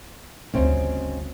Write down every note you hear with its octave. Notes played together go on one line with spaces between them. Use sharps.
G1 D2 C#3 C4 D#4